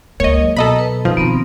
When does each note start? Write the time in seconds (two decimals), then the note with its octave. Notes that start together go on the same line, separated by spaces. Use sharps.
0.20 C#2 G#3 A#3 C#5 D#5
0.42 F#3
0.57 B2 A4 D#5 A#5 B5
0.79 B4
1.05 C3 F3 D#4
1.17 B2 D#3 B3 C4 A#5 B5